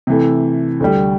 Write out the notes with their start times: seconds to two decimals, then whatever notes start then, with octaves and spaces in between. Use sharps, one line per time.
0.07 C3 E3 A3
0.80 D2 D3 G3